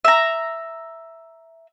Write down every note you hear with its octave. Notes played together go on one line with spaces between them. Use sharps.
E5 A#5